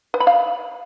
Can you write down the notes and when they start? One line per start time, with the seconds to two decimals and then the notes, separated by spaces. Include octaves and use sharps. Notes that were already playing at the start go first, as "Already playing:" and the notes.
0.14 B4
0.20 B5
0.27 F5